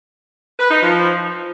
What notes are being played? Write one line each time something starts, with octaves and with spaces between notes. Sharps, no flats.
B4
D#4
F3